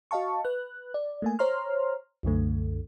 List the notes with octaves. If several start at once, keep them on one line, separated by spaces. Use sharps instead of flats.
F#4 D#5 F5 A5 C#6
B4 F#6
D5
A3 A#3 G#5
C5 C#5 A#5 C6 F6
C2 F#2 D3 A3